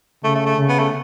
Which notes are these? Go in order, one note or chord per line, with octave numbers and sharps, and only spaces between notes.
C#3 A3
A3
A3
C#3
B3
A3